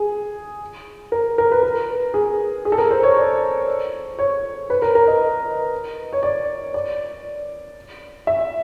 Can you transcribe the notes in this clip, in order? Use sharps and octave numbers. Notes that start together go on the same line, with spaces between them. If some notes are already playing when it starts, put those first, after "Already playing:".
Already playing: G#4
A#4
A#4
B4
A#4
G#4
G#4
A4
A#4
C5
C#5
D5
C#5
B4
A#4
A#4
D#5
C#5
D5
D5
E5